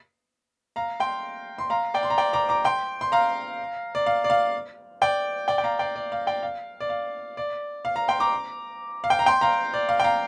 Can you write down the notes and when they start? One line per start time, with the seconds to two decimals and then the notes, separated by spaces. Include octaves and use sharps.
0.76 F5 A#5
1.00 G5 C6
1.58 C6
1.70 F5 A#5
1.94 D5 G5
2.03 C6
2.10 A#5
2.18 D5 G5
2.33 A#5 D6
2.49 A#5 D6
2.64 G5 C6
3.01 C6
3.12 F5 A#5
3.95 D5
4.06 F5
4.24 D5
4.30 F5
5.02 D5 G5
5.48 D5 G5
5.58 G5
5.64 F5 A#5
5.79 D5 G5
5.96 D5
6.12 F5
6.27 D5 G5
6.43 F5
6.80 D5
6.89 F5
7.37 D5
7.85 F5
7.96 F5 A#5
8.08 G5 C6
8.20 A#5 D6
9.04 F5
9.10 G5
9.19 A#5
9.26 G5 C6
9.41 F5 A#5
9.74 D5
9.89 F5
10.00 G5
10.04 F5 A#5